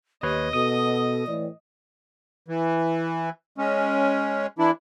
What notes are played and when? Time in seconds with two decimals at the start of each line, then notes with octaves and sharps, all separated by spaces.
0.23 D#2 G4 B4 C#5 D#5
0.53 B2 A4 D#6
1.27 A2 E3 D5
2.48 E3
3.58 G#3 C#4
4.59 E3 D4 E4